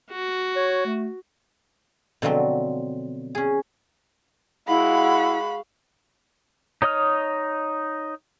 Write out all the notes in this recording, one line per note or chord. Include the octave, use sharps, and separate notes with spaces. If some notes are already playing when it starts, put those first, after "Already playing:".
F#4
C#5
A3
B2 D3 F3 F#3 C4
C#4 G#4
G#3 E4 F#4 F5 F#5 B5
D#4 C#5 D#5 D#6 F6